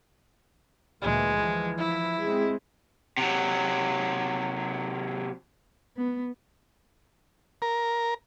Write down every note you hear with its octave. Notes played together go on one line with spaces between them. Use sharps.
D2 A#2 E3 G#3
E3 F3
E4
G#3 C4
C3 F#3
B3
A#4